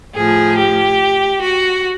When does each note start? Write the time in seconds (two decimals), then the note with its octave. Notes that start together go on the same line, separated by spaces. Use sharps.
0.14 A2 F3 G#4
0.57 G4
1.41 F#4